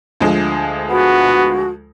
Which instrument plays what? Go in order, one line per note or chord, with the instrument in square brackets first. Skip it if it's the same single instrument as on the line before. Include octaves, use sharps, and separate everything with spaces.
[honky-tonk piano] D2 F3 G#3
[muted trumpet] B3 [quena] F#4